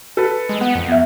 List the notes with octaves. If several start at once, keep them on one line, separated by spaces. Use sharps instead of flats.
A4 B4
G#3
B3 F#5
F2
B3 E5